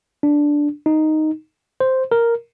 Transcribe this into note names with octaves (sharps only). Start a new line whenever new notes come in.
D4
D#4
C5
A#4